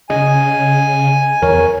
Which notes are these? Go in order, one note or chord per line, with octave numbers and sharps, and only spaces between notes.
C#3 D#5 G#5
E2 A#4 C#5